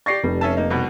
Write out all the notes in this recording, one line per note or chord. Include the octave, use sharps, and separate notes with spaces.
G4 D5 C#6 A6 A#6 C7
F1 G3
C#4 E5 A5
A#3 D#4
C2 B2